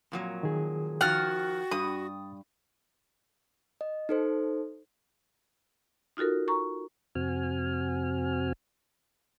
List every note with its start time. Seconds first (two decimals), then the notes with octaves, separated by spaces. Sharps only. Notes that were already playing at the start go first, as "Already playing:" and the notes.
0.12 F2 A#2 F#3
0.43 D#3 G#4
1.01 D#3 F3 F#4 F#5 G5 F6 A6
1.71 G2 D#6
3.81 D#5
4.09 D#4 A4 C5
6.17 D#4 F4 F#4 A4 A#4
6.48 A#5 C#6
7.15 F2 C3 C4 F#4 G#5 F6